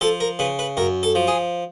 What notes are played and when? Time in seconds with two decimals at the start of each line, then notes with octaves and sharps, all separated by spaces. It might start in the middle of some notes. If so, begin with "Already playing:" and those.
0.01 F3 A4
0.20 A#4
0.39 C#3 B4
0.59 B4
0.77 F#2 A#4
1.03 A4
1.15 F3
1.27 G#4